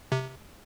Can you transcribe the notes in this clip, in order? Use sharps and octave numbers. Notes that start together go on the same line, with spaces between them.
C3